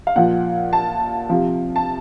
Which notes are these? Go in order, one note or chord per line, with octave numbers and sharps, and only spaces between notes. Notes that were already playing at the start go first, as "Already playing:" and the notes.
F5
A#2 F3 F#5
A5
C3 F3
A5